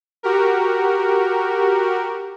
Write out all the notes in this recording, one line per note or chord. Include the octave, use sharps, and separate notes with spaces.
F#4 G4 A#4